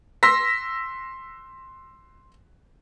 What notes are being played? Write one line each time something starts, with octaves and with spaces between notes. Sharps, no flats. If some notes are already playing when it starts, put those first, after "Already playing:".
C6 E6 A#6 B6